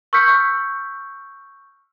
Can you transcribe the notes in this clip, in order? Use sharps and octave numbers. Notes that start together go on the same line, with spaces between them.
C#6 E6 F6 G6 B6 C#7